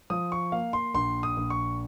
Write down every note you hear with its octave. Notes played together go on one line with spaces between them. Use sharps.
F3 D#6
C#6
A#3 F5
C6
A#1 C6
D#6
A#1
C#6